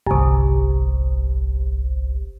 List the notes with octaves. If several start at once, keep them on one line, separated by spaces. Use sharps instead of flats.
G1 C2